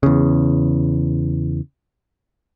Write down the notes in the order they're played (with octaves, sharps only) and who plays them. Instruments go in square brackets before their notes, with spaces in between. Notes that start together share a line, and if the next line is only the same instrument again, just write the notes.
[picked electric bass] E2 C#3